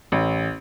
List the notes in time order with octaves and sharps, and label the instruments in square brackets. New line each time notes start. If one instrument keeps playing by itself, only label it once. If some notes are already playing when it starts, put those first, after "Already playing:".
[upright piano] A1